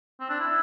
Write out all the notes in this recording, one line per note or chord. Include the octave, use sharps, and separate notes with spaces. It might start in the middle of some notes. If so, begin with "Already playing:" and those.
C4
D4
E4